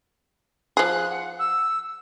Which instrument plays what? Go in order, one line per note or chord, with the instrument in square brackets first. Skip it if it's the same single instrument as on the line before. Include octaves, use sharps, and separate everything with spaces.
[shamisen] F3 G#4 [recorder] F#6
[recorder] F#5
E6